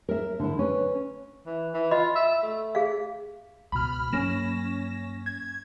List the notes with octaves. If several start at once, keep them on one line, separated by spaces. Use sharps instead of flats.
A#4 E5
D3 E4
C#4 B4
E3
E3
F4 D#5 B5
E5
A3
G#4 F5
C#2 B2 B5 F6
G2 F#3 A#3 C#4 A#6 E7
G#6